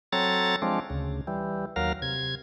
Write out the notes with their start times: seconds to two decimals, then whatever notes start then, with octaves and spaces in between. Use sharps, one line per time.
0.13 F#3 C4 A4 C#5 A#5 A6
0.62 F3 G#3 C4 D4
0.90 D2 C#3
1.27 E3 G3
1.76 D#2 F#3 A#4 F5
2.02 C3 G#6